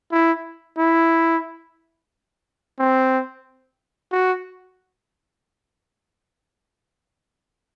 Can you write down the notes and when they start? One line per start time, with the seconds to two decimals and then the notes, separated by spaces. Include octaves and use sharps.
0.12 E4
0.78 E4
2.79 C4
4.12 F#4